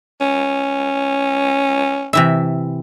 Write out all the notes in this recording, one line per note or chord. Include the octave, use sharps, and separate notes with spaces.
C#4
C3 E3 E5